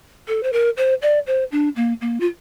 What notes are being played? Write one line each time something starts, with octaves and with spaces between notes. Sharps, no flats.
A4
C5
A#4
C5
D5
C5
D4
A#3
A#3
F4